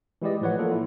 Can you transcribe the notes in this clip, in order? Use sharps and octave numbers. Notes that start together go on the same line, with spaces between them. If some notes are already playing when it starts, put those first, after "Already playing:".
E3 G#3 E4 G4 D5 D#5
A2 F3 B4 C#5 F#5
A#3 F4 A4
E4